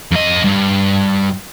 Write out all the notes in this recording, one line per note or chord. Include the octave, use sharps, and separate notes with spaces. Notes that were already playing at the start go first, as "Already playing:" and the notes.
F2 D#5
G2